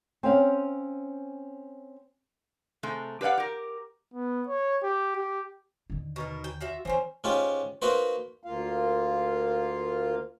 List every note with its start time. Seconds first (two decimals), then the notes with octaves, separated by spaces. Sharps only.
0.23 C4 C#4 F5
2.83 C3 G#3 A3
3.21 G4 B4 D5 F5 F#5
3.38 G4 A#4
4.14 B3
4.48 C#5
4.83 G4
5.16 G4
5.90 D#2 D3
6.16 B2 D#4 A#4
6.44 G5
6.61 F4 F#4 E5
6.85 E3 C4 C#4 C5
7.24 G#2 C#4 F4 G4
7.82 A#3 D#4 F#4 B4 C5
8.43 D2 A#3 F4 F5